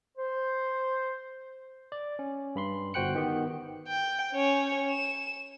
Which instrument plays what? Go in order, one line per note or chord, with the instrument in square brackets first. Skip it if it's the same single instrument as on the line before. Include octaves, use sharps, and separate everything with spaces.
[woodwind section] C5
[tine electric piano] D5
C#4
G2 B5 C6
G1 F#4 C5 G5 F#6 C#7
D#3 B3 G4
[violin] G5
C#4 C#5
E7